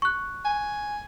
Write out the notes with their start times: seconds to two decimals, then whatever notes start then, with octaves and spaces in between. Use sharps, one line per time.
0.02 C#6 F#6
0.45 G#5